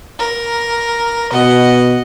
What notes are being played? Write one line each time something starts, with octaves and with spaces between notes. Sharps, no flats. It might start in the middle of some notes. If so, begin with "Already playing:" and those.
A#4
B2 D#5 F#5